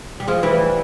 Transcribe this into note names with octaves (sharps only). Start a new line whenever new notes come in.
G3
F3 G#3
E3 G3